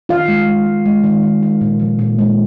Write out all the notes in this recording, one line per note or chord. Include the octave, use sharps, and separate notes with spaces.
D#3 F4 F5
G#3
G#3
G#3
G#3
D#3
D#3
G#3
A#2
F3
A#2
G#3